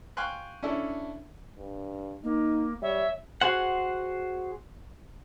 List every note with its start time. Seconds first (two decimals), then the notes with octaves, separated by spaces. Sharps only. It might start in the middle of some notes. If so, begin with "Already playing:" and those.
0.17 F5 G5 G#5 C6 C#6 F#6
0.63 C#4 D4 E4 A4
1.58 G2
2.24 A#3 D#4
2.82 G3 C#5 E5
3.42 F#4 G#4 C5 F#5